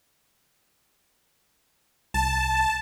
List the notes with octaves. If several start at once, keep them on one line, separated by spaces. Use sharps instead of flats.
C2 A5